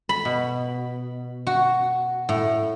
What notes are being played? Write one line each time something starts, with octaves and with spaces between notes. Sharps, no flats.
B5
B2
F#4
A2